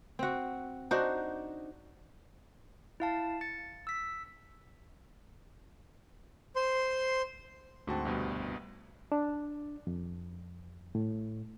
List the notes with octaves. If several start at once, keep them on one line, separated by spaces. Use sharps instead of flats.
C4 F#4
D4 D#4 F#4 C5
E4 F5 A5
A6 C#7
E6 B6
C5 C6
D2 G#2 C4 F#4 A5
C2 G2 B2
D4
F2
A2